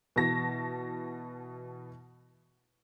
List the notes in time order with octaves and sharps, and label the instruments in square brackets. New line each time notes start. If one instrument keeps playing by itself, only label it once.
[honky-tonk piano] B2 E3 A5 A#6